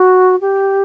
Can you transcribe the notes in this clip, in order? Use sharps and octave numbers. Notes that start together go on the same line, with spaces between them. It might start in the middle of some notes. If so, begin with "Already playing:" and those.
Already playing: F#4
G4